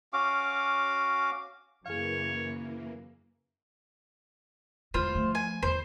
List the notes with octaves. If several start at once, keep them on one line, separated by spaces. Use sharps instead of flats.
C#4 F#4 F5 D6
F#2 C#3 E3 A#3 G#4 C#5 F5
E2 G#3 F4 C5
F3 A3
G#5
E2 C5